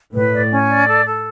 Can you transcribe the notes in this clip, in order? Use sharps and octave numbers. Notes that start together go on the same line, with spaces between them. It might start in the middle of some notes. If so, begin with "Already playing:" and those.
A2 B4
D5
C#4
D5
A4
A4